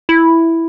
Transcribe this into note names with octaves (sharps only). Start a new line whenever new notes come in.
E4